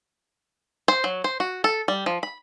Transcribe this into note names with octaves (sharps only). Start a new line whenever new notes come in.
C5
F#3
C5
F#4
A4
G3
F3
B5